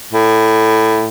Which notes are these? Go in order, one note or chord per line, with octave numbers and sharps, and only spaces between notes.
A2